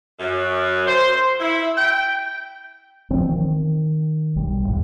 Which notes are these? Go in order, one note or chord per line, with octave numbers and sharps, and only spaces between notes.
F#2
C5
E4
G5
E3 F3 C4
D#3
B1 G3
E2 G#2